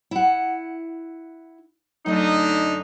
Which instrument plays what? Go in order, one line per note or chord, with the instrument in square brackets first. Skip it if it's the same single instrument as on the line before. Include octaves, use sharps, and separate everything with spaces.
[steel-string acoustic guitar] E4 F#5
[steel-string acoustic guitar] F#2 A3 D#5 [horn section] D3 D#4